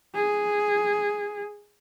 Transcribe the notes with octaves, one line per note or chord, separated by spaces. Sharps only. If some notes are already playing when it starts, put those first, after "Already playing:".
G#4